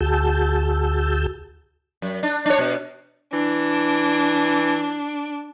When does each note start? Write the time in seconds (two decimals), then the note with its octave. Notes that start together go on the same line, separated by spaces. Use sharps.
0.01 D2 F#4 G#4 A5 E6 G6
2.02 F#2
2.23 D4
2.46 D4 C#5
2.59 B2
3.33 E3 D4